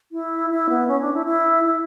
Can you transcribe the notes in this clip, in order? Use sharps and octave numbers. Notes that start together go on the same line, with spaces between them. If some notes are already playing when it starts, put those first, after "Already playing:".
E4
E4
B3
C#4
D4
E4
E4
E4